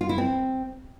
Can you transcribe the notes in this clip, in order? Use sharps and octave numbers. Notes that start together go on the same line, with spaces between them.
F4
E4
C4